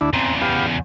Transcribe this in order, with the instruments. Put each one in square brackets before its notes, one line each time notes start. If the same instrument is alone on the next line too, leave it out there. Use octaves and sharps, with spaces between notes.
[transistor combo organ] D2 D4 E4
[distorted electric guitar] E2 C#3 [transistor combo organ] C4 A#5
[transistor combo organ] B3 G4 F5